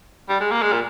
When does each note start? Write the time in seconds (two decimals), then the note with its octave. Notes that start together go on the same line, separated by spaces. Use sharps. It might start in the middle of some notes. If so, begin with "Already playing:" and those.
0.29 G3
0.41 G#3
0.51 A#3
0.62 G#3
0.72 A#2